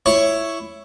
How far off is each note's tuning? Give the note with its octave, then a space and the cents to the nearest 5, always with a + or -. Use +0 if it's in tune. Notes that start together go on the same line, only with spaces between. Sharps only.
E4 +5 C#5 +0